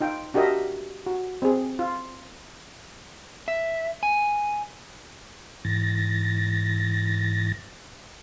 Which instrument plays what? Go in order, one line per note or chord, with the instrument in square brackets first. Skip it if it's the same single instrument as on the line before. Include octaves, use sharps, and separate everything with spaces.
[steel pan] D#4 F4 G5
D4 F#4 G4 A#4 D#5 E5
F#4
C4 G#4
F4
[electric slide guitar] E5
G#5
[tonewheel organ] G#2 E3 A6 A#6